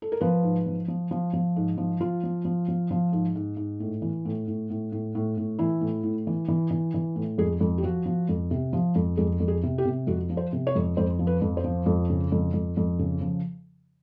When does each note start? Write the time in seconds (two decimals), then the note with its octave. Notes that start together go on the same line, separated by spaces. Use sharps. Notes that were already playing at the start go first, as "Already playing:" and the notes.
0.02 A4
0.12 A#4
0.21 F3 B4
0.43 G#2
0.66 F3
0.88 F3
1.11 F3
1.33 F3
1.56 G#2
1.78 F3
2.00 F3 F4
2.23 F3
2.45 F3
2.68 F3
2.91 F3
3.13 G#2
3.36 G#2
3.57 G#2
3.80 A2
4.02 E3
4.25 A2
4.48 A2
4.70 A2
4.92 A2
5.15 A2
5.37 A2
5.59 E3 E4
5.81 A2
6.03 A2
6.27 E3
6.48 E3
6.71 E3
6.94 E3
7.16 A2
7.38 F2 G#4
7.61 F2
7.78 G4
7.83 F3 F#4
8.06 F3
8.29 F2
8.51 C3
8.73 F3
8.95 F2
9.17 F2 G#4
9.40 F2
9.48 G#4
9.63 C3
9.78 G4
9.85 C3
10.07 F2 F#4
10.30 F3
10.37 C5
10.53 C3
10.67 C#5
10.75 F2
10.97 F2 C5
11.19 F3
11.27 B4
11.42 F2
11.57 C5
11.64 F3
11.86 F2
12.10 C#3
12.32 F2
12.53 F2
12.77 F2
12.99 C#3
13.21 F3